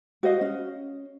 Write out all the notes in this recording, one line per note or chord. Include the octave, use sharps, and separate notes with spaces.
F#4 C5 D#5 F5
C#4